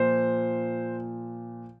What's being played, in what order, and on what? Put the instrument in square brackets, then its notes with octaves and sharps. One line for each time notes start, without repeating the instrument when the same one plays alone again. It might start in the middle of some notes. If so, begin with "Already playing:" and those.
Already playing: [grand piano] A#2 F3 C5